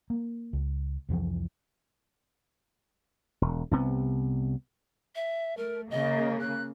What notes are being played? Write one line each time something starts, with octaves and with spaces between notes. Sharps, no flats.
A#3
C#2
C2 F2 E3 F3
E1
C2 C3 B3
E5
A3 A#4
C#3 A#3 D#5
F#6